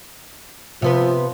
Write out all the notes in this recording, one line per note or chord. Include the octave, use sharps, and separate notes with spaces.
C3 F3 B3 B4